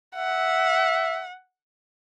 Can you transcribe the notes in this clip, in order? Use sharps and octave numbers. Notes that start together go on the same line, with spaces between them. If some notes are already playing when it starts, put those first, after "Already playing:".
E5 F#5